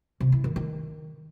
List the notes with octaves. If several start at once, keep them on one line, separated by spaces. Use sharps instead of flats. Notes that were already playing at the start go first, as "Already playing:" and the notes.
C3
E4
D#3
D#3